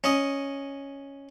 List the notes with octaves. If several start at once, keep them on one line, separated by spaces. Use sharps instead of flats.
C#4 D#5